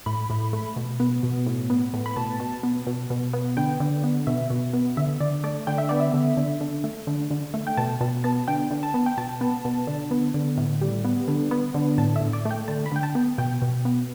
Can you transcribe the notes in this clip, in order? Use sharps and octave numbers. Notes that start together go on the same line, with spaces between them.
A2 B5
A2
A3
B2
B3
B2
A2
B3
A2
B5
B2 A5
B2
B3
B2
B2
B3
D3 G5
D3
B3
B2 E5
B2
B3
D3 E5
D3 D5
A3 D5
D3 G5
E5
B3 D5
E5
D3
D3
D3
A3
D3
D3
A3
G5
B2 A5
B2 A5
B3 A5
D3 G5
D3
A5
B3
G5
B2 A5
B3
B2
D3
B3
D3
A2
G3
B3
D3
B3
D3
A2 A5
E5
A2
D5
A3
G5
D3 A5
B5
D3 G5
A5
B3
B2 G5
B2
B3